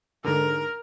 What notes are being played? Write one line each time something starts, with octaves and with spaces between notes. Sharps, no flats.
G#2 D3 A#4